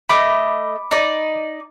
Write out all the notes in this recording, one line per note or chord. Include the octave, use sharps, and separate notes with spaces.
A3 D#5 B5 D6
D#4 D5